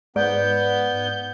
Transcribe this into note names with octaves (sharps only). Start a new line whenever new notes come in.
G#2 B3 D5 G6